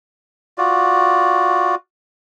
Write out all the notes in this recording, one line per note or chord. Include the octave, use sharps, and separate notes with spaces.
F4 F#4 D5